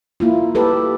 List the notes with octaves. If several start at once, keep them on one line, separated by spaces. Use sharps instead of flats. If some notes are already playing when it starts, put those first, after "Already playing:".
A#3 E4 F4
G4 A4 B4